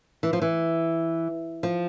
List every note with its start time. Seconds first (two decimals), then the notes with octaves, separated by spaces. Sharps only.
0.23 E3
0.33 F3
0.42 E3
1.63 F3